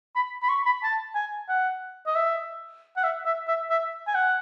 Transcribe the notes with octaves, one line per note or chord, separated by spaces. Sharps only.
B5
B5
C#6
B5
A5
G#5
F#5
D#5
E5
F#5
E5
E5
E5
E5
G#5
F#5